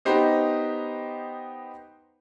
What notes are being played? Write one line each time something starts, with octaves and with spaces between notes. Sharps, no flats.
B3 D#4 G4 C5 D#5